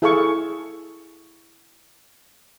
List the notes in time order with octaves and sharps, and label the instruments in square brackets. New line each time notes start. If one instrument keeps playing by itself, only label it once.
[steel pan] E4 G#4 A4 F5 G#5 C#6